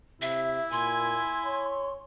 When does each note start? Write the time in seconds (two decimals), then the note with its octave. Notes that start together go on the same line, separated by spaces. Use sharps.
0.22 C3 E4 E5
0.72 A#2 G#5 C6
1.46 C#5